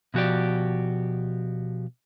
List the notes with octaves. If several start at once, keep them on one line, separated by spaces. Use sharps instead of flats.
B2 F3 F#4 G4 D5